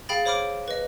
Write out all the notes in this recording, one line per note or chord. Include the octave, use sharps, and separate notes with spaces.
G#4 F5 G5 B5 A6
C5 C#5 B5 D6 F6 D7
B4 D#5